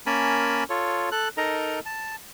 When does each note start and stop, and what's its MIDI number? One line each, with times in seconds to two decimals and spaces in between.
0.06 0.64 58
0.06 0.64 61
0.06 0.64 70
0.06 0.64 80
0.06 0.64 81
0.06 0.64 83
0.70 1.09 65
0.70 1.09 69
0.70 1.09 73
1.12 1.28 69
1.12 1.28 90
1.37 1.80 63
1.37 1.80 69
1.37 1.80 70
1.37 1.80 75
1.37 1.80 82
1.86 2.16 81